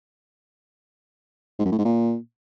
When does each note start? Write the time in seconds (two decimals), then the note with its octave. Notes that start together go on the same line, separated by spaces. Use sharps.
1.59 G#2
1.65 F#2
1.72 A2
1.78 G#2
1.85 A#2